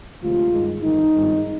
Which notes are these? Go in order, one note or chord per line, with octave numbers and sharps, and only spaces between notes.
D2 C3 F3 G#3 F4
G2 D#3 G#3
G1 F2 D#3 D#4
G#1 G2 F3 G#3